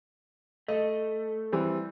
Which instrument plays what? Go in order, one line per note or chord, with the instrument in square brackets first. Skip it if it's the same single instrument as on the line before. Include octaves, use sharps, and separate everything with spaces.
[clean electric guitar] A3 [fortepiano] D#5
[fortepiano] E3 G3 C4